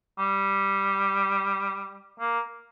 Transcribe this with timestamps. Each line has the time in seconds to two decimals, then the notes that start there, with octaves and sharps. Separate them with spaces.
0.19 G3
2.19 A#3